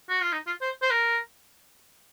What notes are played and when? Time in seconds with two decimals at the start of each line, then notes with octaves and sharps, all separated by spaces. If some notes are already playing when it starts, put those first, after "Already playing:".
0.09 F#4
0.21 F4
0.32 D#4
0.47 F4
0.61 C5
0.82 C5
0.91 A#4